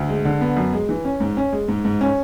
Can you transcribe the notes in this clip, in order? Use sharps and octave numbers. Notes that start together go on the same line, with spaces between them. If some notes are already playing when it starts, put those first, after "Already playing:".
Already playing: D2
G#3
D3
B3
F#2
G#3
E3
C#4
G#2
C#4
G#3
G#2
G#2
C#4